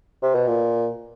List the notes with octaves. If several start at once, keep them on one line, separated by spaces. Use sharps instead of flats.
C3
B2
A#2